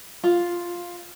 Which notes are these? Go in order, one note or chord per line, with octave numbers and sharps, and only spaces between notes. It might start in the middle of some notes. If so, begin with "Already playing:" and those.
F4